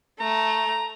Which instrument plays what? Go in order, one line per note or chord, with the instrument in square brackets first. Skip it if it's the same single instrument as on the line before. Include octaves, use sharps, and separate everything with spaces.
[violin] A3 [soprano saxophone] A#5